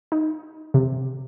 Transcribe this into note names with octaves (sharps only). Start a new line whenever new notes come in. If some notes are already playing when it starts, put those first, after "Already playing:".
D#4
C3